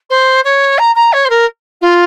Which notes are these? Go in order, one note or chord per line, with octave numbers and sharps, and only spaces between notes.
C5
C#5
A#5
A#5
C#5
C5
A#4
F4